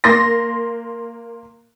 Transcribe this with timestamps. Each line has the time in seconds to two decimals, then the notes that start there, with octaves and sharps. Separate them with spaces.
0.04 A#3 C6 A#6